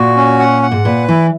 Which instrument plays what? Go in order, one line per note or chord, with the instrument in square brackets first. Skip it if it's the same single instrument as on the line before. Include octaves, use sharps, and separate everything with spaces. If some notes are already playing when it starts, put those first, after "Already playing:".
Already playing: [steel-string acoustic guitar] A#2 [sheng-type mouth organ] F#4
[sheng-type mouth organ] C#4
F#5
F#5
[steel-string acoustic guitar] G#2
[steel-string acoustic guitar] A#2 [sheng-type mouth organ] B4
[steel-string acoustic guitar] E3 [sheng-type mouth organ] E4